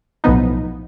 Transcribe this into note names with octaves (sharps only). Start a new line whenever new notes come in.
B1 A2 F3 B3 D#4